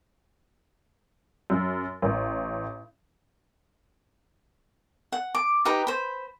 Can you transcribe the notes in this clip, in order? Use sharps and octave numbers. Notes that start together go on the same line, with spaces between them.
F#2
A1
F#5
D6
D#4 G4 B4 A#5
C5 B5